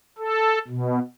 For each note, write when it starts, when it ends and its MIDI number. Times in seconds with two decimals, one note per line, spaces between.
0.18 0.58 69
0.67 0.99 47